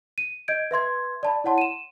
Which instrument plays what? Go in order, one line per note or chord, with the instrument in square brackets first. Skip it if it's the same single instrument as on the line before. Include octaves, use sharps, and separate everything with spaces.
[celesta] D#7
D#5 G6 G#6 D7
B4 E5 C6 G#6
D5 A5 B5
E4 C#5 F#5 A5 C6
D#7 E7